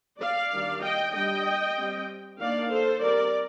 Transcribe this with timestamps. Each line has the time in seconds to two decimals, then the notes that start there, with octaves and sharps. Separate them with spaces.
0.20 D5 F5
0.52 D#3 G3 D4
0.83 D#5 G5
1.14 G3 D4 D#5 G5
1.77 G3 C4
2.39 D#3 A#3 D4 D5 F5
2.71 A4 C5
3.02 G3 C4 A#4 D5